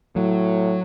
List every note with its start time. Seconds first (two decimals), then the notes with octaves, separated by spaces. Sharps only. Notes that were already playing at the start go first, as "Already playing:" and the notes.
0.16 A2 F#3